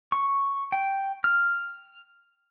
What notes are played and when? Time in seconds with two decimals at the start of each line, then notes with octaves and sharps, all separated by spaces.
0.12 C#6
0.72 G5
1.24 F6